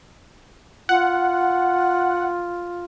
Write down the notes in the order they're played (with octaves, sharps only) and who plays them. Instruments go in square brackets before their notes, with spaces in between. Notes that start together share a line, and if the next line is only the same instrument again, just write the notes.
[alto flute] F4 [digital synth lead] F#5